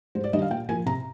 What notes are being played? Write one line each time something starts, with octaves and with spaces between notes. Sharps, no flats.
G#2 C5
D5
D#3 G3 D4 D#5
F5
A#2 G5
F3 A#3 G#5
C3 A#5